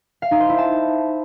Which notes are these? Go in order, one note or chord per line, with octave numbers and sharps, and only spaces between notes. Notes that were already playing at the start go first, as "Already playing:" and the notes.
F5
D#4
C5
E4
A5